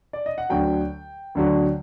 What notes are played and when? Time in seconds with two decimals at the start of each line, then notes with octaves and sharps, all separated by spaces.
0.13 D5
0.26 D#5
0.38 F#5
0.50 D2 D3 F#3 G5
1.35 D2 D3 F#3